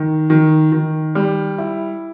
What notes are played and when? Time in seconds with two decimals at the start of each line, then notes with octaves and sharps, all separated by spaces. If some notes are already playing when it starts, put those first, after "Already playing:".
Already playing: D#3
0.30 D#3
0.72 D#3
1.15 G3
1.58 E4